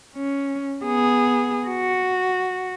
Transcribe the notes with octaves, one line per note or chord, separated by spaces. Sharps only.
C#4
B3 G#4
F#4